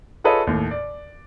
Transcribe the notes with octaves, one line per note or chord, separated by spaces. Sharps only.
F4 G#4 A4 B4 C#5 D#5
D#2 A2
D5